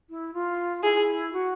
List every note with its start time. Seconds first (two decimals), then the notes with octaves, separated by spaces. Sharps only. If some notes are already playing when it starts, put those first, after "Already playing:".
0.10 E4
0.34 F4
0.84 E4 G#4
1.33 F#4